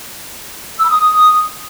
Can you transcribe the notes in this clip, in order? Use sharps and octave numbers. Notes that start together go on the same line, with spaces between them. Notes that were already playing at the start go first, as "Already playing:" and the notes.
E6
B5
D#6